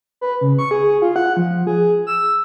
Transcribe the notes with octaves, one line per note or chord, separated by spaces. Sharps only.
B4
C#3
C#6
G#4
F4
F#5
F3
G#4
E6